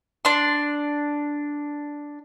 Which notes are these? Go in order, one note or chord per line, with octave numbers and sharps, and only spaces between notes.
D4 C6